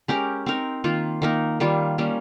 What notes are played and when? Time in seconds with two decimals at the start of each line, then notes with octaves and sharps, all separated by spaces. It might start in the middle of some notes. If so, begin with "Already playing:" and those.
0.08 G#3 C#4 G4 A#4
0.46 C4 D#4 A#4
0.84 D#3 A#3 F4
1.22 D#3 A#3 D#4 A#4
1.60 D#3 G3 A#3 F4
1.98 G3 A#3 C#4